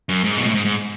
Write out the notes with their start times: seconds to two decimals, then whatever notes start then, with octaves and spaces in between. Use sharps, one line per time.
0.09 F#2
0.24 G#2
0.37 B2
0.46 A2
0.55 G#2
0.65 G#2